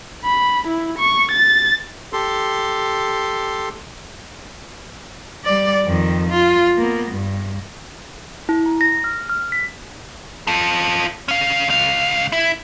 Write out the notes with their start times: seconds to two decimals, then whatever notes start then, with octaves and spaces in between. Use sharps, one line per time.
0.25 B5
0.67 E4
0.98 C#6
1.31 A6
2.13 G4 A4 C6
5.44 G3 D5
5.86 F2 D#3
6.30 F4
6.78 A#3 B3
7.11 G2
8.49 E4
8.66 A#5
8.81 A#6
9.04 F6
9.29 F6
9.52 B6
10.47 F4 A4
11.28 C#4 F5
11.67 C#2 F5
12.32 E4